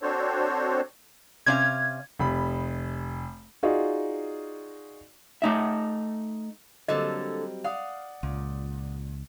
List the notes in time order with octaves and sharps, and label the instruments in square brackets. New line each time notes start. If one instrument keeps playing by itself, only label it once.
[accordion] C4 D4 F#4 A4 C5 C#5
[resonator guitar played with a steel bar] C3 C#4 F5 [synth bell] G#6
[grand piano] F1 B5
[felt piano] D#4 F4 F#4 G#4 D5 D#5
[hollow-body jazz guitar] A3 D#4 E5
[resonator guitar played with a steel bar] D3 A#3 A4 [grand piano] F#3 G3 C4 [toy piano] D#5
[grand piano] D5 F#5 D#6 [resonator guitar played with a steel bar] F5
[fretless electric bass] C#2 [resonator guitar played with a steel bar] A#2